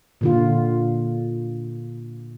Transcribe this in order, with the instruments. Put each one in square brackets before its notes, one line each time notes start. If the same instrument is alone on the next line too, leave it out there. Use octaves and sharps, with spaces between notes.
[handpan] A#2 D3 F4